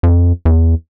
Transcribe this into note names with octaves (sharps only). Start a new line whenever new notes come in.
F2
E2